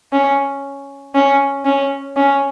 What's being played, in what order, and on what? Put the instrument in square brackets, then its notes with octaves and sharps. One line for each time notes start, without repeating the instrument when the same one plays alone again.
[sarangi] C#4
C#4
C#4
C#4